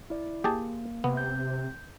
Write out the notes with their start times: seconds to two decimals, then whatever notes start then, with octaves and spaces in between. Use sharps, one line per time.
0.10 E4 D5
0.44 A#3 G4 G#4 A5
1.04 C3 B3
1.17 G6